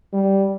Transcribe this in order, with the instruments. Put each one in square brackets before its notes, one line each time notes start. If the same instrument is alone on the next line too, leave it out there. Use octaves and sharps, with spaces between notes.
[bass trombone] G3